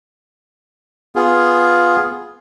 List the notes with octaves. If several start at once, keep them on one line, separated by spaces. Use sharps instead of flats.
B3 F4 G#4